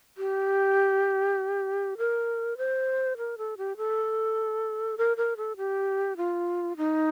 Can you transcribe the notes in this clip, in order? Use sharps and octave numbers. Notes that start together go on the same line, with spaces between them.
G4
A#4
C5
A#4
A4
G4
A4
A#4
A#4
A4
G4
F4
D#4